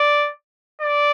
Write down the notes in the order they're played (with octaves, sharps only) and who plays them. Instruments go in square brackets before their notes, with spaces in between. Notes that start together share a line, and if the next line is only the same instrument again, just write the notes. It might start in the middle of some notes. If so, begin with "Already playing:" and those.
Already playing: [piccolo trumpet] D5
D5